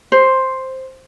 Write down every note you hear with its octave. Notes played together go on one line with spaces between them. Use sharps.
C5